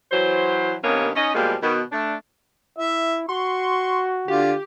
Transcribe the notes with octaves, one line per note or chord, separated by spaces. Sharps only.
E3 F#3 C5
G2 C3 D#3 A#3 B3 C#4
C#4 D#4 D#5
B2 F3 G3 G#3 A#3
B2 D#3
A3 D4
E4 E5
F#4 C6 C#6
D3 F4 G4